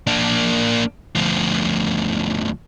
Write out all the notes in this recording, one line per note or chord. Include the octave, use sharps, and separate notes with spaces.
A#3 D4
D2 F3